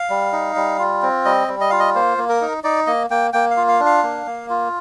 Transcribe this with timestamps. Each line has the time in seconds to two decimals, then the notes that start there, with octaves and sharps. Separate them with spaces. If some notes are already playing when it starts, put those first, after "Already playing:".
Already playing: F5
0.10 G3
0.32 D#4
0.56 G3
0.79 F4
1.02 C4
1.25 G3 D#5
1.48 G3
1.61 D#5
1.70 F4 F5
1.80 D#5
1.95 A#3 C5
2.18 A#3
2.29 A#4
2.41 D#4
2.64 D#4 D5
2.87 A#3 D#5
3.10 A#3 G5
3.33 A#3 G5
3.51 F5
3.57 F4
3.68 F5
3.80 D4
3.86 F5
4.03 A#3
4.26 A#3
4.50 F4